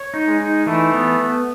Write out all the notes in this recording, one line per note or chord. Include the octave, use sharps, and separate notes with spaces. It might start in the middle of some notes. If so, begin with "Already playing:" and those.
Already playing: C#5
D#4
G#3
D#4
E3 A3
B3